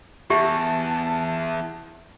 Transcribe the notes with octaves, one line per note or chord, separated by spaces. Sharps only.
E2 G4 E5 A5